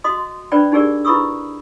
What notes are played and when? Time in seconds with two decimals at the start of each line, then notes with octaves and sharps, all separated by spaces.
0.04 F#4 D#5 C6 D#6
0.52 D4 B4 C5 D5 G5 B5
0.72 D4 D#4 G4 G#4 A#4 D5
1.05 E4 B4 B5 C#6 D#6 E6